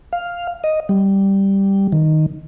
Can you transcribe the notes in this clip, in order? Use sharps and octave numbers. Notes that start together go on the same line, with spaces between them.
F5
D#5
G3
D#3